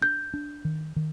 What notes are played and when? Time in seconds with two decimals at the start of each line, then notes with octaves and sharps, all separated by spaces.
0.02 D4 G6
0.34 D4
0.65 D#3
0.96 D#3